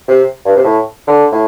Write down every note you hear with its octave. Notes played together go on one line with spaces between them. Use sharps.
C3
G2
C3
A2
D3
A2